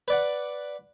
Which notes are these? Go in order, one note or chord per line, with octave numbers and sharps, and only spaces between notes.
B4 D5 F#5